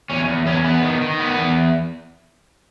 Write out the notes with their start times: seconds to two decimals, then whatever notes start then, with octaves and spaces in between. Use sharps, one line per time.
0.10 E2 C#4
0.28 E2
0.46 E2 C#4
0.64 B3
0.82 D#3
1.01 D#3
1.19 B3
1.37 E2